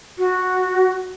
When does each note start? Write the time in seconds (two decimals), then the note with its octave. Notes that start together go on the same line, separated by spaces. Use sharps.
0.18 F#4